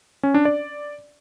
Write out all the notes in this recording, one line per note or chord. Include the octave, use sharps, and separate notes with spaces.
C#4
D4
D5